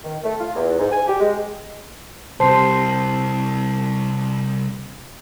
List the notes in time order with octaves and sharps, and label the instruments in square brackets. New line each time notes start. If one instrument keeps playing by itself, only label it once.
[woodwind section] D#3
A3
F4
E2
G#2
G#5
G4
G#3
[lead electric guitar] C2 [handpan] C3 C5 [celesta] A5 C7